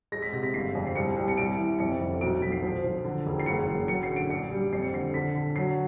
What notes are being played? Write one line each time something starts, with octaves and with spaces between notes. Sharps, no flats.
G#3 A#6
B6
C3 A#6
B6
G1 C7
F2
C7
C2 C#7
C2
C#7
C2 D7
E3
F2 C#7
F1
B1 D7
B1 B6
C7
F3
F3
D3
E1
C7
F#1 C#7
F#1
F#3 C#7
C7
D3
D7
A#1 C#7
G3
F2 C7
C#7
D3 C7
D3 B6
D3
F#3 C7